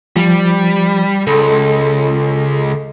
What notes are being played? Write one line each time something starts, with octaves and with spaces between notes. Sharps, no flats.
F3 G3
C#2 A4